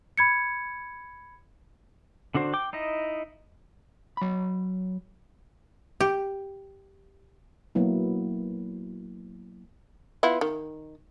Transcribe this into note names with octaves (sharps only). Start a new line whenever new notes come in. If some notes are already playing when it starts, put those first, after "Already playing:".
B5 G#6 C#7
D3 D4 F#4 C5
G5 D6
D#4 E4 D#5
F#3 B5
G4
F#3 A#3 B3 E4
B3 E4 F4
D#3